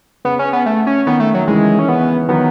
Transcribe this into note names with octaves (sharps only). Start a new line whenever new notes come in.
C#3 B3
C#4
B3
A3
C#4
D#3 B3
A3
F#3
C#3 E3 G#3
C#4
B3
D#3 F#3 B3